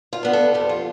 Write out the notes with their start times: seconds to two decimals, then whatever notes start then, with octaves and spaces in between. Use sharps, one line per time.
0.13 F4
0.23 B3 D4
0.33 A4
0.54 F2 G4
0.69 F4